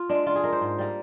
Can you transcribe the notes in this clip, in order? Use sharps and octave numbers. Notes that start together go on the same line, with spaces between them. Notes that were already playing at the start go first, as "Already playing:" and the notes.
Already playing: F4
G#3 D4
D3 F4
G#4
G#3 A#4
C5
G#2
G3 A#3